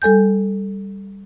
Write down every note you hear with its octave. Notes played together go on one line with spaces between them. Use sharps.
G3 A4 G#5 G6